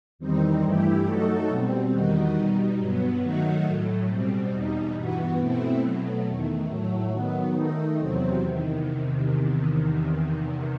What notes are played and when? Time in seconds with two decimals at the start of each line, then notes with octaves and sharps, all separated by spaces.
0.19 E2 D#3 G3 C4 D#4
0.62 G2 E3 A3 E4 G4
1.05 F#3 A3 D#4 F#4 A4
1.48 B2 G3 C4
1.92 E2 D#3 G3 D#4 F#4
2.35 B2 G3 D#4
2.78 G2 F#3 B3
3.21 D#3 F#3 A3 D#4 F#4
3.64 A2 F#3 A3
4.08 B2 G3 C4
4.50 E2 B2 G3 D#4
4.94 G2 E3 B3 F#4
5.37 B2 A3 C4 E4
5.80 B2 F#3 A3
6.23 E2 D#3 A3
6.67 A2 F#3 A3
7.09 D#3 F#3 B3
7.53 D#3 A3 D#4
7.96 E2 C3 F#3 C4
8.39 E2 C3 D#3